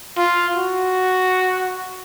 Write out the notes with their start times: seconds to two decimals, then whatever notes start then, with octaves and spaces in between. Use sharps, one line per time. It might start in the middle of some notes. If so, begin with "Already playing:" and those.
0.17 F4
0.57 F#4